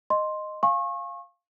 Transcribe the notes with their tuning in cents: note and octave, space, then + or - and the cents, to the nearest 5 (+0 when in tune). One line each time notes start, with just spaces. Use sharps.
D#5 -10 C6 +5
F5 +0 G#5 +0 C#6 -30